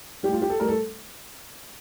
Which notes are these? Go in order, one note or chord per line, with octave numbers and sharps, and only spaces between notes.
A2 G3 G4
F4
G4
A4
A2 G3 A#4
A4